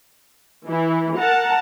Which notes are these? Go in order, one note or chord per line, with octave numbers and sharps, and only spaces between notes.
E3 E4
A#4 F#5 A5 A#5